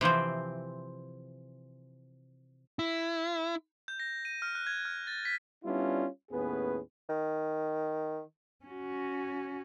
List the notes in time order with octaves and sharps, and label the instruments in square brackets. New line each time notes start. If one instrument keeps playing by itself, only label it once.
[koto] C3 E3 F3 C4
[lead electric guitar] E4
[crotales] G6
A#6
D#7
F6
F#6
G#6
F6
A6
B6
[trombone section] G3 B3 C#4 D4 E4 F4
D#2 A2 B3 C#4 G#4 B4
[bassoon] D#3
[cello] C#4 F#4